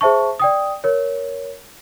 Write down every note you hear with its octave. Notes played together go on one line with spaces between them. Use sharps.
G#4 C5 E5 A5 C#6
D5 G5 D#6
A#4 C#5